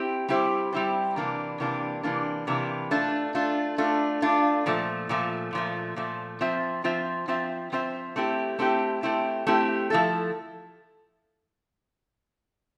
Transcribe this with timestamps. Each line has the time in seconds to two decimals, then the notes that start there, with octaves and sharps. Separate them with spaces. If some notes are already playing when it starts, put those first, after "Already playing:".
Already playing: C4 E4 G4 C5
0.29 G3 C4 E4 G4 C5
0.72 G3 C4 E4 G4 C5
1.16 C3 E3 A#3 D4
1.60 C3 E3 A#3 D4
2.03 C3 E3 A#3 D4
2.47 C3 E3 A#3 D4
2.91 A3 D4 F4
3.35 A3 D4 F4
3.78 A3 D4 F4
4.22 A3 D4 F4
4.66 A#2 F3 A3
5.09 A#2 F3 A3
5.53 A#2 F3 A3
5.96 A#2 F3 A3
6.41 F3 C4 F4 C5 E5
6.84 F3 C4 F4 C5 E5
7.28 F3 C4 F4 C5 E5
7.72 F3 C4 F4 C5 E5
8.16 A3 C4 E4 G4
8.59 A3 C4 E4 G4
9.03 A3 C4 E4 G4
9.47 A3 C4 E4 G4
9.90 F3 A3 E4 A4